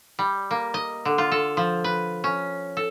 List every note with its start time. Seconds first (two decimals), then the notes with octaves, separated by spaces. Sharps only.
0.19 G3
0.51 A#3
0.74 D#5
1.05 D3
1.18 F4
1.32 A4
1.57 F3
1.84 B4
2.24 C#4
2.77 A4